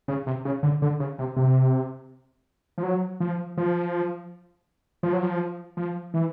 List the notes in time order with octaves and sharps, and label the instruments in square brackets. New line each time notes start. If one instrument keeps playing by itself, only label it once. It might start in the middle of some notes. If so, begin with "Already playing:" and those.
[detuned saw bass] C#3
C3
C#3
D3
D3
C#3
C3
C3
F3
F#3
F3
F3
F3
F#3
F3
F3
E3